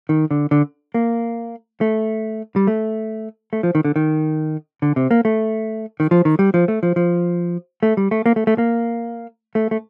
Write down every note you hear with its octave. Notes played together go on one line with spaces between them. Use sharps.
D#3
D3
D3
A#3
A3
G3
A3
A3
F3
D#3
D3
D#3
D3
C3
A#3
A3
D#3
F3
D#3
G3
F3
A3
F3
F3
A3
G3
A3
A#3
A3
A3
A#3
A3
A3